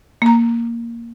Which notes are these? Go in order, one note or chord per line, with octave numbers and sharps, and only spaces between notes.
A#3 A#5